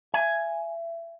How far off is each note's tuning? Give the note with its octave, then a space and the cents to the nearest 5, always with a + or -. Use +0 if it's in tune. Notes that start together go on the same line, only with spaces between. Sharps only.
E5 +30 G#5 +5